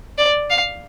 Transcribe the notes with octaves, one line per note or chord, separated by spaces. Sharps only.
D5
F5